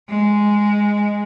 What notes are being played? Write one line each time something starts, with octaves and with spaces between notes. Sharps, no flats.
G#3